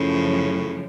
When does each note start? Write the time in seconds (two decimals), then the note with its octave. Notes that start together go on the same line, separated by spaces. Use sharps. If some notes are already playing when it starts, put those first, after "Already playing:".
Already playing: F#2 A2 C#3 F3